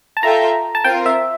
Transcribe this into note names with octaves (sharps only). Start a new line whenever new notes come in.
A5
F4 A4 E5 G5 A#5
A5
C4 F4 A#4 G5
E5